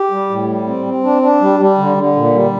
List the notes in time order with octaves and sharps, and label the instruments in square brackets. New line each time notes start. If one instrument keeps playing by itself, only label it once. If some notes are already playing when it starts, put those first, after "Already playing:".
Already playing: [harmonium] G4
G3
A2
G3
C4
C4
D4
D4
G3
G3
D3
D3
A#2
G3